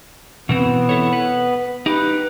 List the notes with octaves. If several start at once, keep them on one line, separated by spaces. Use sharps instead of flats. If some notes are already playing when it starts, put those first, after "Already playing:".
B2 E3 B3 C4
E4 A4 C#5
B4
D#4 G4 B4